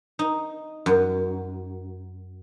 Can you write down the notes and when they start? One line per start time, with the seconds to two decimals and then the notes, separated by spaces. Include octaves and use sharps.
0.19 D#4
0.86 F#2